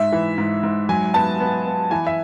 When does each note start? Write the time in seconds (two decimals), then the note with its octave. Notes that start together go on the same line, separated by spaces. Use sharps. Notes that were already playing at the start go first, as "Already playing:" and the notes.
Already playing: G#2 E5
0.12 E3
0.38 G#2
0.63 G#2
0.89 F#3 G#5
1.14 B3 A5
1.40 B3
1.66 B3
1.91 E3 G#5
2.07 E5